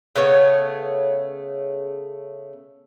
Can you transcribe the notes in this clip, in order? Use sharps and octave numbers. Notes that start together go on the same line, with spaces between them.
C#3 A3 B3 C#5